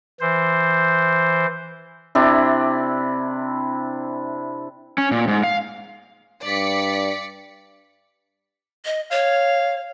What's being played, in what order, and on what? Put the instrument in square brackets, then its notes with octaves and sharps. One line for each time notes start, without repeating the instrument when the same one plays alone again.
[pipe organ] E3 C5
[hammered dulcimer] C3 D4 E4
[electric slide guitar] C#4
A#2
G#2
F5
[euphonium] G2 [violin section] D5 B6 C#7
[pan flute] D#5
[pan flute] C#5 [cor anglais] F5